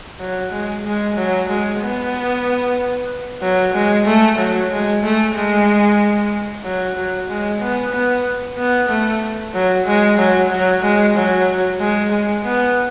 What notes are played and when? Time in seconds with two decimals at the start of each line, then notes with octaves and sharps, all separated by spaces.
0.20 F#3
0.52 G#3
0.85 G#3
1.16 F#3
1.49 G#3
1.81 B3
3.42 F#3
3.74 G#3
4.06 A3
4.39 F#3
4.71 G#3
5.03 A3
5.35 G#3
6.64 F#3
6.96 F#3
7.29 G#3
7.61 B3
7.93 B3
8.58 B3
8.89 A3
9.54 F#3
9.86 G#3
10.18 F#3
10.50 F#3
10.82 G#3
11.15 F#3
11.80 G#3
12.12 G#3
12.44 B3